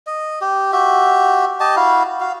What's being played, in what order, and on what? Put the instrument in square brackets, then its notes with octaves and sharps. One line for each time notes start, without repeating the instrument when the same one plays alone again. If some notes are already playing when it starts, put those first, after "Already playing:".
[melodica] D#5
G4
F#4 G4 E5
G4 D#5 A5
E4 F#4 F5
F#4 F5